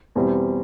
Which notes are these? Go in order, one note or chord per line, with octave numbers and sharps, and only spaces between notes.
E2 B2 G3 C4